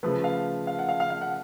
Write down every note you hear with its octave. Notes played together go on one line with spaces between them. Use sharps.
C#3 F3 A3 B4
F5
F5
F#5
F5
F5
F5
F#5